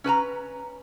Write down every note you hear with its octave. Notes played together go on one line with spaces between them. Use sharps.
C#4 B4 A5 A#5